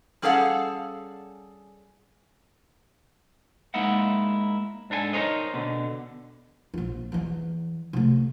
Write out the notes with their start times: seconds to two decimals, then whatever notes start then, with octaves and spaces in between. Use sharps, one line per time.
0.22 G3 C#4 G#4 A4 F5 F#5
3.74 G#3 A#3 D#4 E4 F#5
4.90 G#2 D4 A4 A#4 G#5
5.13 D#4 A#4 C5 C#5 D#5
5.54 B2 D3
6.74 A#1 F4
7.12 E2 E3
7.93 C3 A3